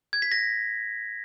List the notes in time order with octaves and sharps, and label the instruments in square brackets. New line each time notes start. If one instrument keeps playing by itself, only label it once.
[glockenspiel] G#6
B6
A#6